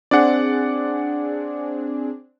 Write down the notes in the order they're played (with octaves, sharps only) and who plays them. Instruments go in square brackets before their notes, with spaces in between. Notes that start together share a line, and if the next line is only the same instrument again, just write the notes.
[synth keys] C4 D4 G#4 [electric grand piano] D5 F#5